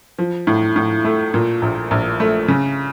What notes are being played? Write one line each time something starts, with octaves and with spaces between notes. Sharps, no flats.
F3
A2
A2
A3
A#2
A#1
A#1
A3
C#3